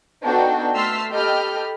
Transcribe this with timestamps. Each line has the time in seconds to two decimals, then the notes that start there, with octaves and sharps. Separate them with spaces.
0.23 B3 D4 D#4 F#4 A4 G5
0.75 A3 A5 C6 E6 F6 B6
1.11 G4 A4 D#5 G5 B5 F6